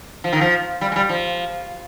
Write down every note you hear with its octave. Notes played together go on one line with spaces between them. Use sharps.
F3
D#3
F3
G3
G#3
G3
F3